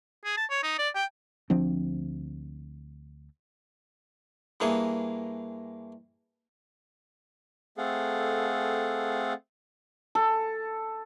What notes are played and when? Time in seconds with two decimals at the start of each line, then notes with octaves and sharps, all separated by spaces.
0.25 G#4
0.37 A5
0.50 C#5
0.63 D#4
0.79 D5
0.95 G5
1.50 D2 F3 C4 D4
4.60 G2 E3 A#3 G#4 C#6
7.78 A3 C4 G#4 A4 F5 F#5
10.15 A4